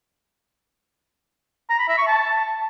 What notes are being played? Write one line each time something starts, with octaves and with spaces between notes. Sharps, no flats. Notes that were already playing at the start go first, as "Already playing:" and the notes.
A#5
B5
E5
C#6
A5